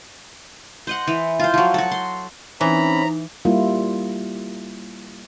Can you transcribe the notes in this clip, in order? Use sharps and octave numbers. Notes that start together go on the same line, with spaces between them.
C5 D#5 F#5
E3
F4 C5
F3 F#3
F#4 A4
C6
E3 C4 C#4 D#4 A#5 B5
G3 A#3 E4 F4